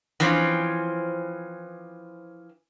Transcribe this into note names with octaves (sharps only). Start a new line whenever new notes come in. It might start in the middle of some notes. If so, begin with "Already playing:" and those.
E3 F3 C4 C#4